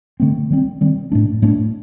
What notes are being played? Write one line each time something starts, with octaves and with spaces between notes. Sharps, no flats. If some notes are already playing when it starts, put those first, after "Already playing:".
D3 A3 C4
D#3 G3 C4
D#3 G3 C4
A2 A3 D4
A2 A3 D4